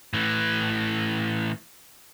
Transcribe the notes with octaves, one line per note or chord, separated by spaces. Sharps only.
A2 E3